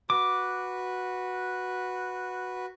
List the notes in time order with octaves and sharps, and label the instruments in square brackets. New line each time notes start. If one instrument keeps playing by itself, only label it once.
[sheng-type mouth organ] F#4 B4 [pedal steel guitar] D6